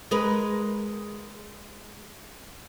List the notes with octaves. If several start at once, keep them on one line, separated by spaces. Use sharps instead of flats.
G#3 A#4 B4